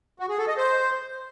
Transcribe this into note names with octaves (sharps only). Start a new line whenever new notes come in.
F#4
G#4
A4
D#5
C5